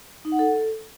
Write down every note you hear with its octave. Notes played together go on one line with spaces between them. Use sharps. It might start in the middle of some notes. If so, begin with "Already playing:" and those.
D#4
F#5
A4